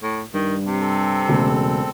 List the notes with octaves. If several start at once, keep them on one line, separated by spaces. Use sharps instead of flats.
A2
G2 D#3
C3
C4 A4
E1 C#3 A3